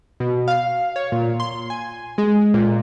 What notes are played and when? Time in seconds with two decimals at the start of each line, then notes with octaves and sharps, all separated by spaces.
0.20 B2
0.48 F5
0.96 C#5
1.12 A#2
1.40 C6
1.70 G#5
2.18 G#3
2.54 A#2